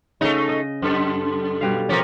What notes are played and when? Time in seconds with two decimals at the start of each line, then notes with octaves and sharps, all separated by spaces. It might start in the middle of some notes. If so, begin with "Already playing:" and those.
0.21 C#3 A3 D#4
0.49 D#5
0.82 F#2 A4
1.61 B2 G3 F5
1.89 C3 F3 C#4 A#4 D5